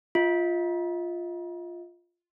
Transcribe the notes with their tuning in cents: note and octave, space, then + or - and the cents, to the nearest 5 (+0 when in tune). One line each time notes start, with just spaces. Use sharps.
F4 +0 D#5 +40